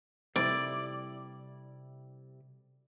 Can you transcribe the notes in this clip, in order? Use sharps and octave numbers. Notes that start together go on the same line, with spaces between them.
C3 G3 E4 D5